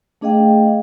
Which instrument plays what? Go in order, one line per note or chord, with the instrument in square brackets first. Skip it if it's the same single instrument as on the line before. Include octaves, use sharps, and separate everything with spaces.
[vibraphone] A3 D4 G#4 D#5 F5 G5